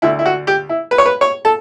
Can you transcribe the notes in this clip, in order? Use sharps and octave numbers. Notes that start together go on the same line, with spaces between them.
D2 D3 E4
E4
F#4
G4
E4
B4
C#5
B4
C#5
A4